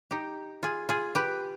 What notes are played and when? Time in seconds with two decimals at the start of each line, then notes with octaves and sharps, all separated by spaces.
0.11 D#4 G4
0.63 F4 G#4
0.89 F4 G#4
1.15 G4 B4